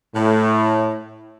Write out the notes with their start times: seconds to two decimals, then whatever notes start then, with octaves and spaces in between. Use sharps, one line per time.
0.15 A2